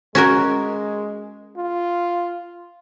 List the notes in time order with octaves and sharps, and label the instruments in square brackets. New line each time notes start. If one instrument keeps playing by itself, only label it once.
[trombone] G#3 [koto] C#4 F#4 A#4
[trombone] F4